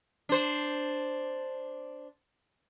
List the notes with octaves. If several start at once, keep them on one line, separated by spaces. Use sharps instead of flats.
D4 C5